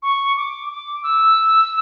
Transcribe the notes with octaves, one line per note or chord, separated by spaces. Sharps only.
C#6
D6
D6
E6